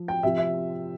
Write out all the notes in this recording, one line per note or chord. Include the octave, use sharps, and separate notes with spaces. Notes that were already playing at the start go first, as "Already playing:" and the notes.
Already playing: F3
G5
C3 F3 E5
E5